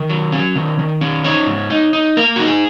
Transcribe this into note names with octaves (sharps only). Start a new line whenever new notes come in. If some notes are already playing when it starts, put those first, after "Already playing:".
Already playing: D#3 A#4
F#3
C#4
D#3
D#3
C#4
D#4 C#5
G#2
D#4
D#4
A#3 A#4
D#4 F#4
G#4